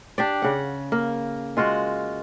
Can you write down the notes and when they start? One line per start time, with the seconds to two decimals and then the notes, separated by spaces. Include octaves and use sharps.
0.18 D4 G4 D5
0.42 C#3 F#5
0.92 A#3
1.57 G#3 F4 F#4 F#5